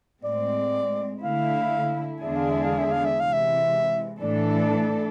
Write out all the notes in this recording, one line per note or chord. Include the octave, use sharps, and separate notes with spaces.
A2 G#3 C4 D5
D3 A3 E4 F5
E2 D3 G#3 D4 G#4 E5
F5
E5
F5
E5
F5
E5
C3 E3 G#3 F5
E5
A2 E3 A3 D4 A4 D5